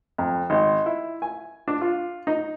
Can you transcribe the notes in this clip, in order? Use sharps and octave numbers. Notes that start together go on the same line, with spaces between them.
F2
G#1
E4
G#5
D4
F4
D#4